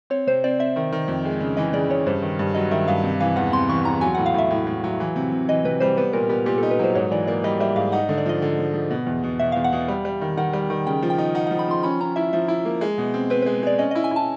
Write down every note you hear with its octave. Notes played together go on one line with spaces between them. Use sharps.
C4 C#5
C3 C5
C4 D5
C4 E5
D#3
D#3
F2
G#3
C#3
E3 D#5
C#3 D5
C#3 C#5
G2 C5
D#3
G2
F#3 D#5
D#3 E5
G2 F5
C3
E3 F5
E2 F#5
C3 C6
E3 C#6
E2 A#5
F#3 G#5
F#5
A2
F5
A2 E5
A2
A2
F#3
E3
C3
C3
E3 D#5
C3 B4
G3 C5
B3 B4
A#2 A#4
B3 G4
A#2 G4
A4
D#4
B4
F#3 C5
G#2 C#5
E3 D5
A#3 D5
G3 D#5
G3 E5
G#2 F5
D#4 F#5
D3
D5
F3 D#5
D3
F3
F3
B2
E2
B2
B2 E5
F5
E2
F#5
B2
G3
G3
D#3
D#3 F#5
G3
D#3
C#3 G5
F3
G5
D#4
D#4 F#5
F#5
F3
B5
F3 C6
C#4 B5
C#4 A#5
E4 E5
F3 E5
E4
A#3
G#3
B2
C4
C4 B4
B4
G#3
G#3 D5
C#4 D#5
D#5
E4
G#5
E4 A5